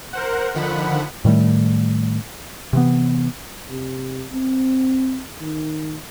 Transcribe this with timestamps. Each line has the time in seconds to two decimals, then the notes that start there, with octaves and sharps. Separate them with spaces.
0.13 A#4 C5 F#5
0.55 D3 D#3 F3 F#5 B5
1.25 A2 D#3 G3 A3
2.73 C3 E3 B3
3.70 C3
4.32 C4
5.40 D#3